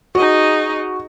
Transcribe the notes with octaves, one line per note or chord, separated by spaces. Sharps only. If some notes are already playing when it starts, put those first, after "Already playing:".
D#4 F#4 G#4 D#5